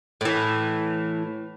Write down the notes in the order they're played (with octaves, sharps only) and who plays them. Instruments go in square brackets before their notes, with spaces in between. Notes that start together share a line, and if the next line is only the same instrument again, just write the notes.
[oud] A2 E3